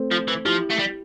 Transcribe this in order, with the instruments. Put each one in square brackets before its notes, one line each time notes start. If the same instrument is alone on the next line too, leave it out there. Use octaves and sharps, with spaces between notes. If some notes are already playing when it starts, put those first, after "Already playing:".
Already playing: [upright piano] A3 C4
[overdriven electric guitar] F3
E3
[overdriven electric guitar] F3 [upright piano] E4 G4
[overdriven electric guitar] A3
G3